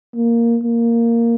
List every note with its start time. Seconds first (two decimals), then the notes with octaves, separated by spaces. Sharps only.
0.16 A#3
0.63 A#3